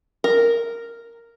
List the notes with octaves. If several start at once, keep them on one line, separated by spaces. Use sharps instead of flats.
A#4